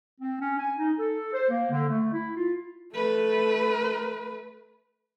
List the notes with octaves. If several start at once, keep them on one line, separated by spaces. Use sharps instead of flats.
C4
C#4
G#5
D#4
A4
C5
A#3
D3
A3
E4
F4
A3 B4